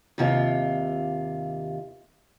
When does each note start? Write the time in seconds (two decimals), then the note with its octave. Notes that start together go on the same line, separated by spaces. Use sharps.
0.18 D#2 C3 F4